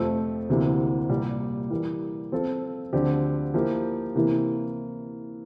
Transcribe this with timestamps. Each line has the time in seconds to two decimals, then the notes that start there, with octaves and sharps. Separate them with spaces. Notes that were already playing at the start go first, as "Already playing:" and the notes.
Already playing: F2 C3 F3 A3 C4
0.49 D2 C3 E3 A#3 E4
1.09 C2 A#2 G3
1.70 E3 G3 A#3
2.32 F3 C4 F4 A4
2.93 D2 D3 F3 C4 G4
3.54 F3 A#3 E4 G4
4.15 C3 E3 A#3 E4